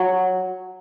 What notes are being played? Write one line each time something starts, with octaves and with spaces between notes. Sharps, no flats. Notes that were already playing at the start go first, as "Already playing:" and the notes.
Already playing: F#3